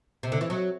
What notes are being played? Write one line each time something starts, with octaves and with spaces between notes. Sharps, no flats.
C3
D3
E3
F#3